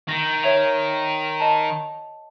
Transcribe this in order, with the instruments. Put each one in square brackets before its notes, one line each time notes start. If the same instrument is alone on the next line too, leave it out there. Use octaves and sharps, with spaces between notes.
[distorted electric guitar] D#3 [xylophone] A#6
[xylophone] C#5 E5 F7
D#5 A5